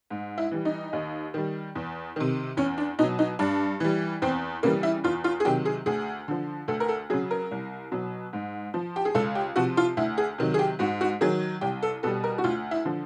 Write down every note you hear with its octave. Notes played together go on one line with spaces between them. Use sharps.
G#2
E4
E3 G3
D#4
D#2
D#3 G3
E2
C3 D#3
E2 C#4
D4
B2 F#3 D#4
D#4
G2 D4
E3 G3
E2 C4
C#3 E3 G3 A#3
E4
E2 F4
F4
G#4
C3 D#3 F#3 G4
G#4
D2 G#4
D3 F3
D2 A4
A#4
A4
C#3 F#3 G#4
A#4
C2
B2 F#3
G#2
F3
G4
G#4
C#2 A4
G4
C3 F3 F#4
F4
D2 E4
G#4
C3 D#3 F#3
G#4
G4
G#2 F#4
F#4
D#3 F#3 G#4
C2 G4
A4
B2 G3 A4
A#4
F#4
D2 F4
E4
D3 F3